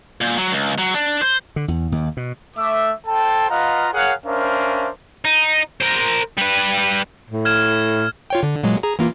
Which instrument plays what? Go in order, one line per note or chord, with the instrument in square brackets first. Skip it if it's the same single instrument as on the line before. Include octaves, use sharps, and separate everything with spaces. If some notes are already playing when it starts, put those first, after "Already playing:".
[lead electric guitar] A#2
F#3
C#2
F#3
D4
C5
[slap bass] D3
E2
D#2
B2
[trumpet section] A3 E5 D6
A4 C5 G5 A5
F4 B4 D#5 F5 F#5 A#5
G#4 A#4 C#5 F5 F#5
C#4 D4 A#4 C5 E5 F5
[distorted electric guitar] D#4
A#4 C5
G3 B4
[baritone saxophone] A2
[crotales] F6 G#6 E7
[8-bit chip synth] F4 C#5 G5
D3
A#2 F#3 G#3
G#4 A#5
E3 A#3 F4